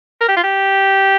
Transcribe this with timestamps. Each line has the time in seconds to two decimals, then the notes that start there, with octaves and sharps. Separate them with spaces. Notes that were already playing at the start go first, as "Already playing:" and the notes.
0.21 A#4
0.28 G4
0.36 F4
0.43 G4